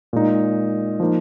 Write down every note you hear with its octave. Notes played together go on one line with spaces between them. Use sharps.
A#2 G#3 D#4
F3 A#3 D#4